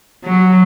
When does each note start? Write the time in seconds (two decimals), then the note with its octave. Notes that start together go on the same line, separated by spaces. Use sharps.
0.25 F#3